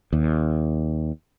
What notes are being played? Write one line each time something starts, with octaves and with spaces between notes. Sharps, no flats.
D#2